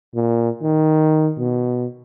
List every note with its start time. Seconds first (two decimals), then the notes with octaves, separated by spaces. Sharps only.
0.14 A#2
0.62 D#3
1.38 B2